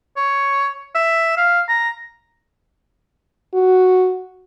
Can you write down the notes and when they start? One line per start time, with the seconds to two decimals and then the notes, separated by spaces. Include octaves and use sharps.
0.17 C#5
0.95 E5
1.37 F5
1.68 A#5
3.54 F#4